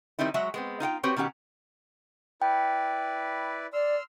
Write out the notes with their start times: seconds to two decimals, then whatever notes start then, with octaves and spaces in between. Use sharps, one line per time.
0.19 D#3 G3 C4 D#4 E4
0.34 F#3 G#3 F#4 E5
0.54 G#3 B3 C4
0.80 D#4 F4 F#5 G5
1.03 C4 F#4 G4 B4 C#5
1.16 B2 D#3 C#4 G4 F#5
2.42 E4 B4 D5 G5
3.73 D5 C6 E6 F6